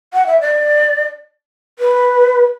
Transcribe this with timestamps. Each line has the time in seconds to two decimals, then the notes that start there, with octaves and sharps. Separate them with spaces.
0.13 F#5
0.27 E5
0.41 D5
1.79 B4